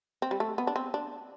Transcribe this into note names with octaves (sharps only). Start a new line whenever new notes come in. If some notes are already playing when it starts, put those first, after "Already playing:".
C4
G3
A3
B3
D4
C4
D4